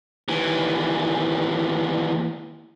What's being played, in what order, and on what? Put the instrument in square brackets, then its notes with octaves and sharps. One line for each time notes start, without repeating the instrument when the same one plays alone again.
[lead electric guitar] D#2 E3